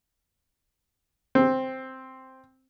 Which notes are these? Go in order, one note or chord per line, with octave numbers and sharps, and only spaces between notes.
C4